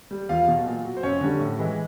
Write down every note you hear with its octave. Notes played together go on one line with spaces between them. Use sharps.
G3
E2 F4 F5
B2 F#3
A#2
F#3
C5
F2 C#4 C#5
D3 G3
A2
E3 G#3